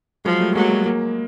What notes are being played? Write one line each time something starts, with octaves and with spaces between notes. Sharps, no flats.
F3 F#3 G#3
G3 A3
F#3 G#3 A#3
G3 A3
G#3 A#3